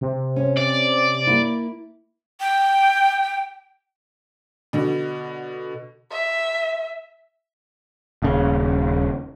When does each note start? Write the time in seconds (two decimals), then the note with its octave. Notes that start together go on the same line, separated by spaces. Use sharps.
0.01 C3
0.36 C#4
0.57 D5
1.27 A#3 E4
2.40 G5
4.73 B2 D3
6.11 E5
8.22 D#1 C#3